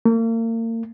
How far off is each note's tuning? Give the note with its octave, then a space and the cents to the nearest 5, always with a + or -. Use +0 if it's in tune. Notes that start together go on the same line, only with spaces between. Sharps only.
A#3 -40